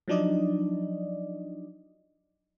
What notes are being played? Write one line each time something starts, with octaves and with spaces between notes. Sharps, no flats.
F3 F#3 D4 D#4 D5 D#5